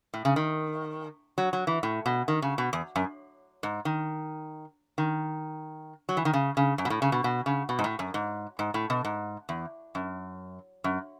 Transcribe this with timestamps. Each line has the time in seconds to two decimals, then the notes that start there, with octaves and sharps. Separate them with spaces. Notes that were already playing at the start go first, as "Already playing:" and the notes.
0.14 A2
0.25 C#3
0.36 D#3
1.38 F#3
1.53 F#3
1.67 E3
1.83 A2
2.06 B2
2.28 D#3
2.42 C#3
2.58 B2
2.73 E2
2.96 F#2
3.63 G#2
3.85 D#3
4.98 D#3
6.09 F#3
6.17 E3
6.25 D#3
6.33 C#3
6.57 C#3
6.78 F#2
6.85 B2
6.90 A2
7.02 C#3
7.12 B2
7.24 B2
7.46 C#3
7.69 B2
7.79 G#2
7.84 A2
7.99 F#2
8.14 G#2
8.59 G#2
8.74 A2
8.90 B2
9.05 G#2
9.49 E2
9.95 F#2
10.84 F#2